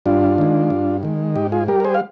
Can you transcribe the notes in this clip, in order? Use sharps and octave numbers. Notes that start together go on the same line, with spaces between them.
G2 D4 F4
D#3 G#3
G2
D#3 G#3
G#2 D#4 G4
F4 G#4
G3 G4 A#4
A#4
G#4 C5
F5